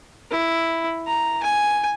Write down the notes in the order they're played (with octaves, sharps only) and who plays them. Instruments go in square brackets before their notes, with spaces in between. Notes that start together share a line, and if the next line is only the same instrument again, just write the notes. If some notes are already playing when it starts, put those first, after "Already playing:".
[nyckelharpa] E4
A#5
G#5